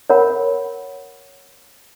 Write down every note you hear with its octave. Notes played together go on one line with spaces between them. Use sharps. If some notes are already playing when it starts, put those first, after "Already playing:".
A#4 C#5 F#5 B5